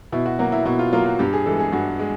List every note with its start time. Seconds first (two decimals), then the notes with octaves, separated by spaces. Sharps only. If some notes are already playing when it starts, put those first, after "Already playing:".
0.12 B2 E4
0.26 F#4
0.39 F#3 A#3 F#4
0.52 E4
0.65 B2 E4
0.79 F4
0.93 F#3 A#3 F4
1.06 F#4
1.19 G2 G4
1.33 G#4
1.46 E3 G#3 A4
1.60 G#4
1.72 G2 F#4
1.99 G#3